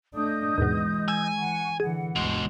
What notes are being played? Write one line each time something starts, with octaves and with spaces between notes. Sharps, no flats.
A3 D4 D#5 D#6 G6
D#2 G#2 B2 E3 G#3
G#5 E6
E3 F#5 C#6
D3 E3 G#4 F#5
G1 D2 B2 G#3